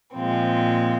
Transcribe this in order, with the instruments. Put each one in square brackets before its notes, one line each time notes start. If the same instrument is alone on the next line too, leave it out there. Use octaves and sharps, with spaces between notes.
[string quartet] A#2 F3 G#3 C4